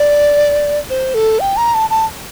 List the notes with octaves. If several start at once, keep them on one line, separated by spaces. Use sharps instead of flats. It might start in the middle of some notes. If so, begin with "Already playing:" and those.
Already playing: D5
C5
A4
G5
A#5
A5
A5